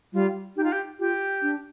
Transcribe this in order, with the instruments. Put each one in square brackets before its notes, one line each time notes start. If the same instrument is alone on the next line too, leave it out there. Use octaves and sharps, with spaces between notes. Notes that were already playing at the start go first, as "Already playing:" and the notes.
[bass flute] G3 [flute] F4
[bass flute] D#4 [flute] G4
[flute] F4
G4
[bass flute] F4 [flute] G4
[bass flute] D4